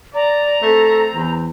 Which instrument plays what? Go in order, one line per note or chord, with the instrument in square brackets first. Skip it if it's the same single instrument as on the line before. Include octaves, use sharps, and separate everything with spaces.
[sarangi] D5 [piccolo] A#5
[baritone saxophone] A3 [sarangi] C4
[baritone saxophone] E2